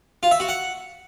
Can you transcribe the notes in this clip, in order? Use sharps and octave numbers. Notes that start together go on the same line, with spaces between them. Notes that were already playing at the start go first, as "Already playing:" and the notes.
F4
E5
F#4
F#5